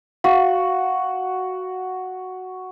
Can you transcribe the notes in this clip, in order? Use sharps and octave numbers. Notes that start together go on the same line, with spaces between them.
F#4 F5